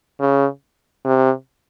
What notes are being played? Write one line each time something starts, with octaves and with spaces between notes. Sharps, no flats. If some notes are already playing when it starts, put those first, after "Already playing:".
C#3
C3